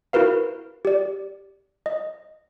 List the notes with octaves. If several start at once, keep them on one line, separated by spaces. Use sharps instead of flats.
E4 F#4 A#4 B4 F5
G4 D5
D#5